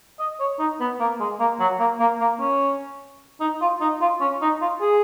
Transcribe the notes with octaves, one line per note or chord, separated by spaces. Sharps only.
D#5
C#5
D#4
B3
A#3
G#3
A#3
F#3
A#3
A#3
A#3
C#4
D#4
F4
D#4
F4
C#4
D#4
F4
G#4